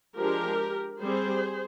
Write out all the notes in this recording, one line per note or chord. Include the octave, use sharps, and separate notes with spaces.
F3 G#3 D4 G4 A#4
G3 C4 G#4 C5